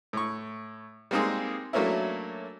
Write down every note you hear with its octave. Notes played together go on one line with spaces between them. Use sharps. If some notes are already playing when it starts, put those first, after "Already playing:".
A2 C#6
G3 G#3 A#3 C4 D#4 G#4
F#3 A3 A#3 C#4 D4 E4